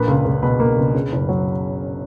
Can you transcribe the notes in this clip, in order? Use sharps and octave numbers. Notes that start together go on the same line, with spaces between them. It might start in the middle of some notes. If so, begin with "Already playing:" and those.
Already playing: A#1 A#3 B4
C#2
C#2
B2 B4
A#3
C#2
C#3
F#1
F#3